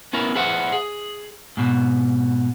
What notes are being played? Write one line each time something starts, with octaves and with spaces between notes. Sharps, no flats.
B3 C#4 E4 A#4
G#4 B4 C5 E5 F#5
G#4
G#2 B2